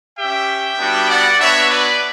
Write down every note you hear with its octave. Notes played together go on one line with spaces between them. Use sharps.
C#4 G4 E5 G5
G3 B3 D4 F#4
D5 F#5
B3 D4 F#4 C#5 E5
B4 D5